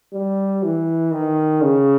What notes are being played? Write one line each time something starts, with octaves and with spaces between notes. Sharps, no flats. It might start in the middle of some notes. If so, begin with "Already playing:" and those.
G3
E3
D#3
C#3